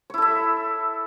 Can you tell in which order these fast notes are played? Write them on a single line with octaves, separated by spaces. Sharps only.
C#5 E4 A4 E5